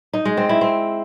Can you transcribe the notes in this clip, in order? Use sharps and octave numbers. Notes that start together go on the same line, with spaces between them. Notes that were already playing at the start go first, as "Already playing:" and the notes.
D#4
G#3
C4
E4
C4